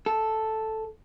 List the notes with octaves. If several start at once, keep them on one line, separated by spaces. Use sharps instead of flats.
A4